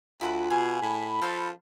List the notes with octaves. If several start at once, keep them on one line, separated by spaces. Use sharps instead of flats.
D2 E4 F4 B4 B5
B2 G#4
A2 B5
F3 A4 C5 F5